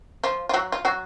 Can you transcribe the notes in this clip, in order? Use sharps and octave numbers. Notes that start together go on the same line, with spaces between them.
F3 F4
F4
F#3 F#4
F4
F#3 F#4